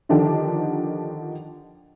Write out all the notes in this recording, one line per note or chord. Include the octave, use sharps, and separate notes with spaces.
D3 D#3 F3 D4 G4